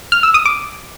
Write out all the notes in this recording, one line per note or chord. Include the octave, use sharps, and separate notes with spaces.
F6
E6
D#6
D6